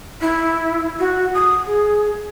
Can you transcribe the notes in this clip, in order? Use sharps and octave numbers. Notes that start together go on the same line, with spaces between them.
E4
F#4
D#6
G#4